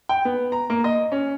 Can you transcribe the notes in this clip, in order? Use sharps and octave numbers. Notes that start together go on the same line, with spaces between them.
G5
B3
A#5
A#3
D#5
C#4